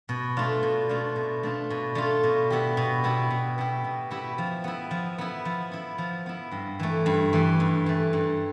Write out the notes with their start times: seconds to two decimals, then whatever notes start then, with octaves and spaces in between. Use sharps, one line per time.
0.09 B2
0.37 A3 D4 F4
0.63 B2
0.89 A3 D4 F4
1.16 B2
1.43 A3 D4 F4
1.70 B2
1.95 A3 D4 F4
2.23 B2
2.50 B3 E4 G4
2.77 B2
3.04 B3 E4 G4
3.30 B2
3.58 B3 E4 G4
3.84 B2
4.11 B3 E4 G4
4.38 F3
4.64 B3 E4
4.91 F3
5.18 B3 E4
5.45 F3
5.71 B3 E4
5.98 F3
6.26 B3 E4
6.52 G2
6.80 E3 A3
7.06 G2
7.33 E3 A3
7.60 G2
7.86 E3 A3
8.13 G2